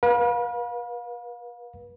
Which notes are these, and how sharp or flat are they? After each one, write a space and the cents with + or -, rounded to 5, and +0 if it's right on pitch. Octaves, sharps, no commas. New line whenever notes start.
B4 -35 F5 +30